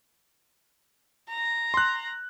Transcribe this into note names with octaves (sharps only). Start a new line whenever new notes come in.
A#5
C6 F#6